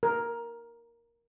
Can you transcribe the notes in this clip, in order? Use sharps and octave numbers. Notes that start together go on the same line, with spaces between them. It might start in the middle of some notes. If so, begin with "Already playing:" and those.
A#4